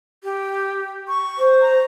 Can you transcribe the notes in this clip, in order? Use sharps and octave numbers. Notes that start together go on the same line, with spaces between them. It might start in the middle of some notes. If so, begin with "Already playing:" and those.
G4
C#6
C5
A#5